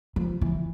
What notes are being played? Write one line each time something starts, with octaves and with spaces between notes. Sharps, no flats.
F3
E3